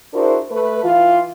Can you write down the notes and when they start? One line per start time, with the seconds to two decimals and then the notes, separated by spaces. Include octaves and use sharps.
0.14 D4 E4 F#4 G#4 A#4 C5
0.51 A3 B4
0.84 E3 F4